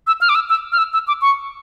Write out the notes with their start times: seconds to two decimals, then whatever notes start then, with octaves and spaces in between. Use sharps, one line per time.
0.07 E6
0.21 F6
0.29 D6
0.35 E6
0.49 E6
0.72 F6
0.78 E6
0.93 E6
1.08 D6
1.22 C#6